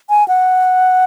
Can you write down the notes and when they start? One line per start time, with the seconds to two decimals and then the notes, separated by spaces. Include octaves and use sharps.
0.10 G#5
0.28 F#5